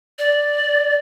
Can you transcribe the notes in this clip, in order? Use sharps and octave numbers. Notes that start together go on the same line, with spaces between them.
D5